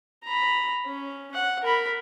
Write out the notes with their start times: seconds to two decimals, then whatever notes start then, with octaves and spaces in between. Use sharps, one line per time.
0.24 A#5 B5
0.86 C#4
1.34 F#5
1.63 A#4 B5